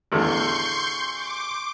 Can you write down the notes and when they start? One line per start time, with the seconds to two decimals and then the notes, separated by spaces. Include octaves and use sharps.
0.12 A1 E2 D3 C6 C#6 G6
1.14 D6